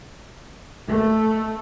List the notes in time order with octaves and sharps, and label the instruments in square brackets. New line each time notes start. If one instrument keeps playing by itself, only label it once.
[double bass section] A3